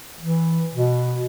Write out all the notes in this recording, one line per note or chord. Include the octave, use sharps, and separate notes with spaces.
E3
B2